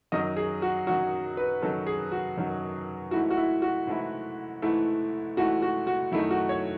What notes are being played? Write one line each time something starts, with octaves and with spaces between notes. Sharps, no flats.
F#2 D#3 F#3 D#5
G#4
F#4
F#2 D#3 F#3 F#4
B4
F#2 D#3 F#3 A4
G#4
F#4
F#2 D#3 F#3
G#2 E3 A3 E4 F#4
F#4
E4
F#4
G#2 E3 A3 E4
G#2 E3 A3 E4
G#2 E3 A3 E4 F#4
F#4
F#4
F#2 D#3 A3 D#4 E4
F#4
C#5